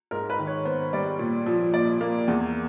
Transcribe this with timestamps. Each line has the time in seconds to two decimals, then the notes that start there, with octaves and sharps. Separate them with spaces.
0.11 G#2 A#4
0.30 B4
0.39 D#3
0.47 C#5
0.65 B3 C5
0.93 G3 D5
1.19 A#2
1.46 F3
1.73 A#2 D5
2.01 A#3
2.28 E2